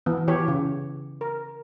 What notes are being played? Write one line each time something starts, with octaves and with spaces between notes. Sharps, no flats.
E3 B3
E3 G4 C#5
C#3
A#4